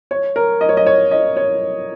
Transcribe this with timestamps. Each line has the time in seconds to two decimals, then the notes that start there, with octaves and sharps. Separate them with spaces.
0.11 C#5
0.36 A#4
0.61 D#5
0.69 C#5
0.77 D#5
0.86 C#5
1.11 D#5
1.37 C#5